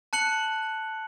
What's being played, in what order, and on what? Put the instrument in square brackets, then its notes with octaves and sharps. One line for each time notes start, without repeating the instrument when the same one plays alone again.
[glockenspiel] A5 F#6 C#7 F#7